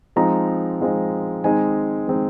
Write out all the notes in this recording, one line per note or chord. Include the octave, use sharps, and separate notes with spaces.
F3 G#3 C4 D#4 A#5
F3 G#3 C4 D#4
D#3 G#3 C4 D#4 G#5
D#3 G#3 C4 D#4